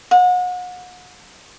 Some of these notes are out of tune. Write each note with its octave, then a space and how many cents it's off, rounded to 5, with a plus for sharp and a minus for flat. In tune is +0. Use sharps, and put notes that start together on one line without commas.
F#5 -35